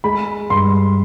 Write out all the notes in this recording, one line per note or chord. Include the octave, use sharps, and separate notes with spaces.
G#3 B5
G2 C6